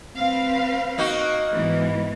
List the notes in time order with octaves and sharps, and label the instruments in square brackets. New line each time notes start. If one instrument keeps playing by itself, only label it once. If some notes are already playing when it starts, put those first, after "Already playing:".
[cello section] C4 B4 F5
[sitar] A#3 D#4 F#4
[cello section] G#2 E3 B3